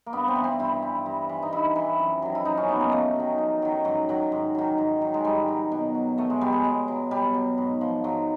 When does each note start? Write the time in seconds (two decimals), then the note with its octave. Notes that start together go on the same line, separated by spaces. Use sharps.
0.06 A#3
0.13 G2 B3
0.28 C4
0.36 E3
0.44 C4
0.59 G2 E4
0.82 E3
1.06 G2
1.29 E3
1.43 D#4
1.53 G2 E4
1.76 E3
1.99 F#2
2.22 D#3 F#3
2.35 E4
2.45 F#2 D#4
2.57 C#4
2.69 D#3 F#3 B3
2.81 A#3
2.92 F#2 A3
3.16 D#3 F#3
3.38 F#2
3.62 D#3 F#3
3.85 G#2 F#3
4.09 D#3 F#3
4.32 G#2
4.55 D#3 F#3
4.78 G#2
5.01 D#3 F#3
5.14 G#3
5.25 G#2 G3
5.48 D#3 F#3
5.72 B2
5.95 F#3
6.18 B2 A3
6.30 G#3
6.41 F#3 G3
6.52 G#3
6.64 B2
6.88 F#3
7.11 B2 G3
7.34 F#3
7.58 G#2
7.81 F3
8.04 G#2 F#3